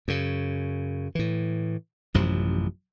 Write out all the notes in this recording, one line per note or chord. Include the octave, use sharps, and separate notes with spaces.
F#2 C#3
A2 E3
A1 F#2 C3 F3